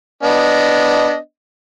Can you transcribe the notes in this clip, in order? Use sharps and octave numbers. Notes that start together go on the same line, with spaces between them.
B3 D4 D#5